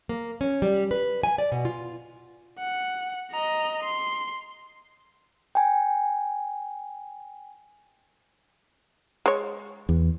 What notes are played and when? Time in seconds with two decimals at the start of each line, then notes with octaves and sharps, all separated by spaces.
0.09 A#3
0.41 C#4
0.62 G3
0.91 B4
1.23 G#5
1.38 D5
1.52 B2
1.65 F4
2.59 F#5
3.32 D#5 A#5
3.83 C6
5.55 G5 G#5
9.26 G#3 C#5
9.89 E2